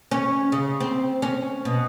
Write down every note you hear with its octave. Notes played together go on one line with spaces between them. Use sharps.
C#4
C#3
C4
C#4
B2